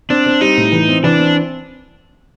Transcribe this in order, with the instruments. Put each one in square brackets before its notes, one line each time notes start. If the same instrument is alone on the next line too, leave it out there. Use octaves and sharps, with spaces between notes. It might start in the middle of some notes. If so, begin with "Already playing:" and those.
[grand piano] C4 [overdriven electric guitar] D4
[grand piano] C4
[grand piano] G3 [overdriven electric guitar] D#4
[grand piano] A2
E3
C4
[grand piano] E3 [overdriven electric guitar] D4
[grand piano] C4